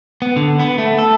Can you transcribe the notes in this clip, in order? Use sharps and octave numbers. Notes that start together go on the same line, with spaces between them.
B3
D3
B3
A3
A4